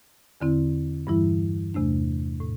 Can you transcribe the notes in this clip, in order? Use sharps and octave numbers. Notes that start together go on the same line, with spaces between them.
E2 D3 C4 E4
G2 E3 G3 E4
E2 C3 A3 D4
A2